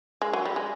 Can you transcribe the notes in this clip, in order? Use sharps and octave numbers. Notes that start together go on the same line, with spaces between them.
G#3
F#3
G3
G#3